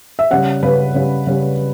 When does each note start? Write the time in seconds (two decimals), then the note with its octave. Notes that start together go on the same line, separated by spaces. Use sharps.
0.19 E5
0.31 C#3 G3 C#4 F#5
0.63 C#3 G3 C#4 B4
0.94 C#3 G3 C#4
1.27 C#3 G3 C#4